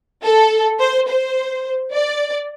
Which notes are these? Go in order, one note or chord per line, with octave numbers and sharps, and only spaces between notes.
A4
C5
C5
D5